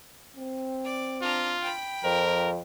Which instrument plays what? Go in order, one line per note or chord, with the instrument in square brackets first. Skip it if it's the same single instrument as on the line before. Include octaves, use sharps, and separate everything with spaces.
[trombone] C4
[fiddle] D5
[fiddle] D4 A#5 [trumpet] F4
[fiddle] G5 B5
[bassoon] F2 [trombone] F3 [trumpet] A#4